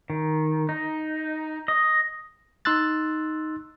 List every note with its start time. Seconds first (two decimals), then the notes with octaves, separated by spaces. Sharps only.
0.10 D#3
0.69 D#4
1.68 D#5
2.65 D#4 C6 E6 F#6 A6